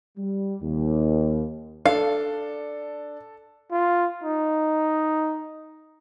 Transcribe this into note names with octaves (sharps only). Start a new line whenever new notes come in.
G3
D#2
D4 A4 F5
F4
D#4